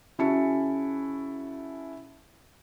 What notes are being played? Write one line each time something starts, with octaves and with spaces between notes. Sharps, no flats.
C#3 C#4 E4 F#4 A5 C#7